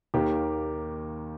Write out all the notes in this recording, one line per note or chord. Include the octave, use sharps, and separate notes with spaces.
D#2 D#3 A#3 G4